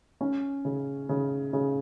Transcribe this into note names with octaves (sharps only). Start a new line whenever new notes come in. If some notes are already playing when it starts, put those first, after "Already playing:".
C#4
C#3
C#3
C#3